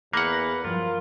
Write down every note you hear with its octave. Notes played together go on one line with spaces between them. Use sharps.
E2 A#3 B4 F#5
G2 F3 F#3 F4 A#4